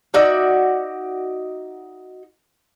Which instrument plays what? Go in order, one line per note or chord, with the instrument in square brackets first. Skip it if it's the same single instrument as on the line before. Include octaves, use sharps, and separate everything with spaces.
[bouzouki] D#4 F#4 D5 E5